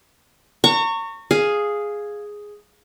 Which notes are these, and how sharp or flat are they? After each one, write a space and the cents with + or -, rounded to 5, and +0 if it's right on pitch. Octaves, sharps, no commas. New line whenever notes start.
A#5 -40 C#6 +0
G#4 +0 F5 +0